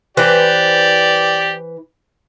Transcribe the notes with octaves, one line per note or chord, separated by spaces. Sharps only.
E3 G4 B4 C5 D5